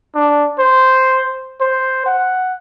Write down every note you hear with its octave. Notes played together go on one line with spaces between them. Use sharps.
D4
C5
C5
F#5